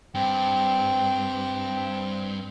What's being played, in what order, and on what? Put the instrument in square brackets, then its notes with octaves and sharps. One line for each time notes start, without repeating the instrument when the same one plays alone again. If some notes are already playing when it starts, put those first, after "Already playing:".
[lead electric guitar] G2 [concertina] C4 G5